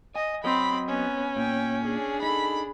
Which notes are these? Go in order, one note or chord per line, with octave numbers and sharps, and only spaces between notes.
D#5 G#5
F#3 C4 C5 C#5 D#5 B5
B3 C#4
A#2 G5
D4 G#4
D#4 A4 B5